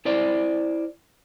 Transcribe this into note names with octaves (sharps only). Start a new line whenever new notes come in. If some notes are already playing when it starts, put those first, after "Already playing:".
E4 A#4 C5 D5